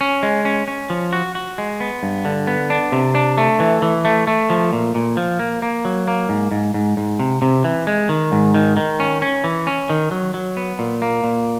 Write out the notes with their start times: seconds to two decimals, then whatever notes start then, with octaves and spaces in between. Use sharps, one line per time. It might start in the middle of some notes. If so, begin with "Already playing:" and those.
0.01 C#4
0.23 G#3
0.45 C#4
0.68 C#4
0.90 F3
1.13 F#4
1.35 F#4
1.58 G#3
1.80 B3
2.03 G2
2.25 D3
2.47 B3
2.70 D4
2.92 C3
3.15 D4
3.38 A3
3.60 E3
3.82 E3
4.05 A3
4.27 A3
4.50 F3
4.73 A#2
4.95 A#2
5.17 F3
5.39 A#3
5.62 A#3
5.85 F#3
6.08 A#3
6.29 G#2
6.51 G#2
6.74 G#2
6.97 G#2
7.19 C3
7.42 C3
7.64 E3
7.87 G#3
8.09 D#3
8.32 G#2
8.54 D#3
8.77 D#3
9.00 C#4
9.22 C#4
9.44 E3
9.67 C#4
9.89 D#3
10.11 F#3
10.34 F#3
10.57 B3
10.79 A#2
11.02 A#3
11.24 A#2